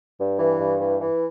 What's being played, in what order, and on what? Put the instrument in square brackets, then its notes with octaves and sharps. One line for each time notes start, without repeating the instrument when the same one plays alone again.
[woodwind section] G2
E3
G2
E3
E3